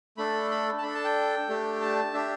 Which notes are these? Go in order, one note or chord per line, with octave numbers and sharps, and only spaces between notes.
A3 D4 A4 B5
B5
A5
D4 A4 B5
A5
G5
A3 D4 G4
A5
D4 G4 E5